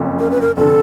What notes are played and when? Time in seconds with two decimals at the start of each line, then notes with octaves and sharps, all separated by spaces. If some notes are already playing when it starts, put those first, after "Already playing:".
Already playing: F#1 F2 C#3
0.20 A#4
0.31 B4
0.41 A#4
0.57 F1 D3 A4